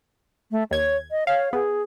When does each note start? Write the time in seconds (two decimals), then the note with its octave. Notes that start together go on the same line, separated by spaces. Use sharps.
0.51 A3
0.71 D#2 C#5 G#6
1.11 D#5
1.27 C#5 F5
1.53 B3 G#4